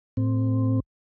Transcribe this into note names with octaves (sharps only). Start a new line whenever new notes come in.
A2 C4